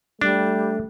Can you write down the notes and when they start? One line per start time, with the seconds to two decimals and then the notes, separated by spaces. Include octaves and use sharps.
0.21 G3 A3 D4